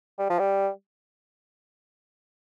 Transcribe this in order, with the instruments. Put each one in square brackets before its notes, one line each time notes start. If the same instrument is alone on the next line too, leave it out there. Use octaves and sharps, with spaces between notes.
[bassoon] G3
F3
G3